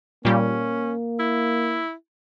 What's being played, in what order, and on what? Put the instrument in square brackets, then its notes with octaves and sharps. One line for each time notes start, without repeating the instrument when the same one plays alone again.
[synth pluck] A#2 G3 [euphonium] A#3 [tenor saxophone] C#4
[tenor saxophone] E4